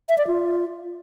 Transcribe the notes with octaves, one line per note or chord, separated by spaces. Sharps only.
E5
D5
F4